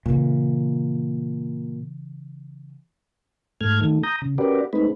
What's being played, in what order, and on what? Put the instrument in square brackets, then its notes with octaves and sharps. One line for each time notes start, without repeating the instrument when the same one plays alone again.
[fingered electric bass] A#2 [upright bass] C#3 E3
[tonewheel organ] G#2 A3 F6 G#6
D#3 A3
A#5 D#6 G6 A#6
C#3
C#4 F#4 G4 A#4 B4 D5
G#3 A3 C4 D#4 B4